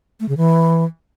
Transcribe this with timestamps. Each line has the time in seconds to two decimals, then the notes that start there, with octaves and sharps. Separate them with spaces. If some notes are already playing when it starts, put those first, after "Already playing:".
0.20 A3
0.29 C#3
0.37 E3